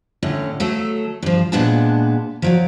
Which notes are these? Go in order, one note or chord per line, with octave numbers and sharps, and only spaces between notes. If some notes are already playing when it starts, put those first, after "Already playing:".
A2 D3 C#4
F#3 A3 A4
G2 F3
A#2 G#3 B3 D4 F#5 A5
F3 F#3 D5